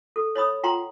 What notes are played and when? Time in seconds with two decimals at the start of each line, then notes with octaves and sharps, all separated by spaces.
0.16 A4
0.35 C#5 D#5 B5 D#6
0.63 F4 F#5 G5 A#5 C6